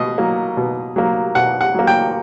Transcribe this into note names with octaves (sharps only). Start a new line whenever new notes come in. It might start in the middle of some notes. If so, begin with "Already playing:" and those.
Already playing: B2 D#5
F#3 A#3
B2
F#3 A#3
B2 F#5
F#5
F#3 A#3
G5